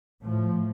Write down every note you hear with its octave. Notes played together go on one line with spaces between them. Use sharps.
A2 F3